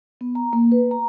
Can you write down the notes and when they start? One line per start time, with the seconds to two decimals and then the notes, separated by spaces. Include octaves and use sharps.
0.21 B3
0.35 A#5
0.53 A#3
0.72 B4
0.91 A#5